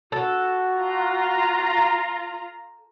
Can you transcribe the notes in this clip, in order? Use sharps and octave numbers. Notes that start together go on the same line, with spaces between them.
F#4 A4
F4 A#5